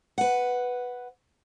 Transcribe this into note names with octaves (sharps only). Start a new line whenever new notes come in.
B4 F#5